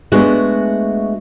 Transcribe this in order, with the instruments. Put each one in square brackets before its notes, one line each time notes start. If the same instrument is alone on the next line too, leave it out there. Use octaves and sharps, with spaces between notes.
[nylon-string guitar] G#3 A3 B3 D4 F#4 G#4